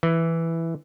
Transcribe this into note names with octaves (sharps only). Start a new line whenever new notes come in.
E3